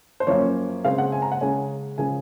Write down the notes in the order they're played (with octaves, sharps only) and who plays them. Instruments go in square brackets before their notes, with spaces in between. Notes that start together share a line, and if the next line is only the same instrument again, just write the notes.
[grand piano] C5
F#2 F3 A#3 C#4 C#5
C#3 G#3 C4 F5
F#5
G#5
A#5
F#5
C#3 G#3 C#4 G#5
C#3 F3 G#3 G#5